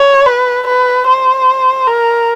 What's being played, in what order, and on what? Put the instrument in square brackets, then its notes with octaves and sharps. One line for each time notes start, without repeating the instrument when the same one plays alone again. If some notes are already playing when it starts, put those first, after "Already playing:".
Already playing: [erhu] C#5
B4
B4
C5
A#4